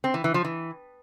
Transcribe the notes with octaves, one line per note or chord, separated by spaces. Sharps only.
C4
E3
E3
F3
E3